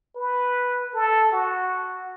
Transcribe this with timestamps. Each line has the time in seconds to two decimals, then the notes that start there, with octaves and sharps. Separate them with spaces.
0.16 B4
0.94 A4
1.32 F#4